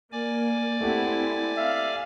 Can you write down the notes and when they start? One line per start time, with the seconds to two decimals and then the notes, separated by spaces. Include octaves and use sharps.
0.12 A#3 D5 G#5 D6
0.81 A3 C4 E4 G4 F#5
1.56 E5 F5